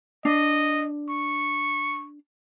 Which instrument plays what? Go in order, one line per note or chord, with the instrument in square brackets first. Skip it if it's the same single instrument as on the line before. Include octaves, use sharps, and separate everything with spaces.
[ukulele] D4 [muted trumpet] D#5
[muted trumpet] C#6